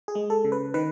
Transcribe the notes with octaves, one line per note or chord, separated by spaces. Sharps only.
G#4
G#3
A4
C#3
B4
D#3 B4